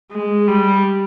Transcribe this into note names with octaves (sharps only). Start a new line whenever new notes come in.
G#3
G3